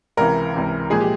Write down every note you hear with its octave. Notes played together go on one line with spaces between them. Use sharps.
C#2 C3 E3 A#4
C#2 C3 E3
A#2 F3 G#3 G#4
G4